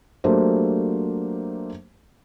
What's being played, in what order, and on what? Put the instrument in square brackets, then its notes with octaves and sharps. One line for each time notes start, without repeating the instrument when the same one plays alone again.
[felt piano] F#3 A3 A#3 D4 G4 C5